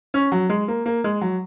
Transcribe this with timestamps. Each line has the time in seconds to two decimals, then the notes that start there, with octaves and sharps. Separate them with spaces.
0.14 C#4
0.32 F#3
0.49 G#3
0.68 A#3
0.86 A#3
1.04 G#3
1.21 F#3